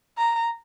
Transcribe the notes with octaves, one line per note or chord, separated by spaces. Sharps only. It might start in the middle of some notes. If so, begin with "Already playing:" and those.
A#5